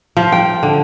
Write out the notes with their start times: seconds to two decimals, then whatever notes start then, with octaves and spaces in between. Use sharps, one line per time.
0.17 F3
0.32 G5
0.63 D3